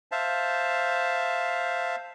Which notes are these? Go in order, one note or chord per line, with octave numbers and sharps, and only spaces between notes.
C5 E5 F5 A5